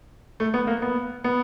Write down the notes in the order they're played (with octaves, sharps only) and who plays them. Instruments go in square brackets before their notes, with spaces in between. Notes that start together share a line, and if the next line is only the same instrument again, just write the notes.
[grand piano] A3
B3
A#3
B3
B3